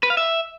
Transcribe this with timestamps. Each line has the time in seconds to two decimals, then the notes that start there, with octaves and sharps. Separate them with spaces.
0.03 B4
0.10 F5
0.17 E5